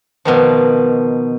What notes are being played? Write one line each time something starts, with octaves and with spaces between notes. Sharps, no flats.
B2 D#3 F3